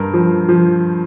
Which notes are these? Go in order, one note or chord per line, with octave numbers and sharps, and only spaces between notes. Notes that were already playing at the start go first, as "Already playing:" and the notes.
Already playing: G2 A#4
F3
F3